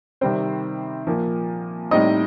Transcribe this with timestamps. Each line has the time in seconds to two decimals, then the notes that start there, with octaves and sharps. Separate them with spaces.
0.21 C3 D#3 G3 C4 C5
1.07 A#2 F3 A#3
1.91 A2 G3 C4 D#4 D#5